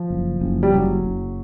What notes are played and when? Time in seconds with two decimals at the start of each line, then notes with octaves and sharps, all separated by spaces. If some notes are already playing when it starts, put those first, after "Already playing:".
Already playing: F3
0.10 F#1
0.41 F#1
0.63 G3
0.73 F#1 F#3
1.05 F#1